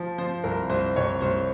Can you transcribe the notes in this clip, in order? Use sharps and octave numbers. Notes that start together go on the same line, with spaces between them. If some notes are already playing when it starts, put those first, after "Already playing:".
Already playing: F3
F3 C5
C2 A#4
C2 C5
C2 C#5
C2 C5